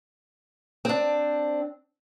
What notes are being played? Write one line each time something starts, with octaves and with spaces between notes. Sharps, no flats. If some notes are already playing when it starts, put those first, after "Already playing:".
C4 D4